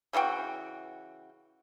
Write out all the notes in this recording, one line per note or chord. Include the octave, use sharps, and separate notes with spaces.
C#3 E3 F#4 G5